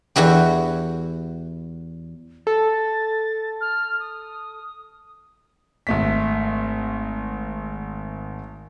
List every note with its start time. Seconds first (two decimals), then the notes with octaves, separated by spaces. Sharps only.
0.16 E2 E4 F#4 G4
2.47 A4 A6
3.61 F6
4.00 D#6
5.87 G#1 A3 B6